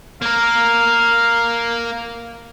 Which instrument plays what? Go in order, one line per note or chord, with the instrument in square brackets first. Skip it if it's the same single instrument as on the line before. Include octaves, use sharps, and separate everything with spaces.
[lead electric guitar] A#3 A#4 [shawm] F5